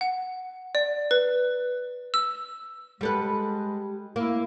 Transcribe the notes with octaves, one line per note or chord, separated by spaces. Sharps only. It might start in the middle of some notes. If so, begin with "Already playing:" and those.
F#5
D5
B4
E6
G3 G#3 A4 B4
A#3 E4